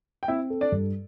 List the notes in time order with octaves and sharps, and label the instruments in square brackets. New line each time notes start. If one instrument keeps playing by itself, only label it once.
[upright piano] G5
[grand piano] C4 [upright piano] E4 E5
[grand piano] A4
[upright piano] D4 D5
[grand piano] G2